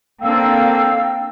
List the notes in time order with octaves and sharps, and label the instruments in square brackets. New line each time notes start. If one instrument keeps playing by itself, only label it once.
[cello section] A#3 C4 D4 [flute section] A4 F5 E6 [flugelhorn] G5